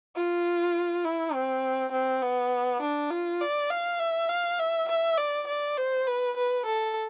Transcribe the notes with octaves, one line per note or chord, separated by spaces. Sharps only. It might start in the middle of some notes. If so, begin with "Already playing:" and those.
F4
E4
C4
C4
B3
D4
F4
D5
F5
E5
F5
E5
E5
D5
D5
C5
B4
B4
A4